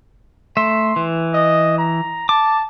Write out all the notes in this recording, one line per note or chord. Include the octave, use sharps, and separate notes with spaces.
A3 E5 C6
E3
D#5
A#5
A5 D6